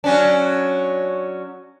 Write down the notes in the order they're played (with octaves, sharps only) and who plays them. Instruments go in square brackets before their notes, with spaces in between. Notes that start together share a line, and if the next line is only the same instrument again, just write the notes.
[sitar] F#3 C#4 D4